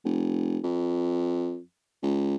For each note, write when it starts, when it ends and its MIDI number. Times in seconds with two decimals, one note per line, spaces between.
0.05 0.58 29
0.63 1.59 41
2.02 2.36 37